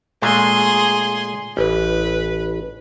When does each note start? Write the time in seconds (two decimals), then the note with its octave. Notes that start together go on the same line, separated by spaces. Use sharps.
0.22 A#2 G#3 A3 G#4 C6
1.57 A1 B4